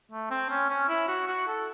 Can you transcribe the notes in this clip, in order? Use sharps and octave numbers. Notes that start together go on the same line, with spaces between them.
A3
C4
C#4
C#4
E4
F#4
F#4
A4